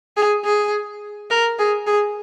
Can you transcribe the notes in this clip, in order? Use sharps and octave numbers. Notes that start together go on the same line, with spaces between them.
G#4
G#4
A#4
G#4
G#4